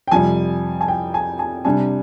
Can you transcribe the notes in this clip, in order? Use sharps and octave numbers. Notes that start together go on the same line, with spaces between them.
G5
F2 C3 G3 G#5
G#5
G5
G#5
G#5
C3 G3 D4 G#5